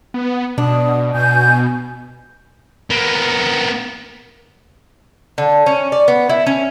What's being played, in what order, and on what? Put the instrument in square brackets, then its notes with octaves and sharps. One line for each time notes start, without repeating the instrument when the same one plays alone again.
[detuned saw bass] B3
[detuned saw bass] B2 [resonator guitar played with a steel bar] D4 [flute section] D#6
[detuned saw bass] B2 [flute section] G#5 G6
[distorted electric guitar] A#3 B3
[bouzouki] D3
C#4
D5
B3
E4
C#4